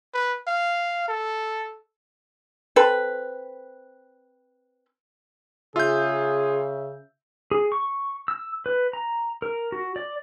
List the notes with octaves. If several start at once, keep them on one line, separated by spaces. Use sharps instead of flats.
B4
F5
A4
C4 A4 B4
C#3 F4 G#4 E5 E6 G6
G#4
C#6
E6
B4
A#5
A#4
F#4
D5